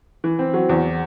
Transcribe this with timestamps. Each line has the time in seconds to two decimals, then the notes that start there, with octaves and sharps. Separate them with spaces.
0.24 E3
0.39 C4
0.54 F#3
0.69 E2